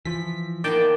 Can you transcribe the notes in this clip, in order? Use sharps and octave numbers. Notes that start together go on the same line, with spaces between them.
E3 F3 B6
D#3 A#3 B3 D5 G5 A5